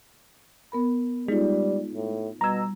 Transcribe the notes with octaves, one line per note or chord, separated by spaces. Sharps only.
B3 A#4 B5
G3 G#3 D#4 F4
A2
B2 G3 A#5 E6 G#6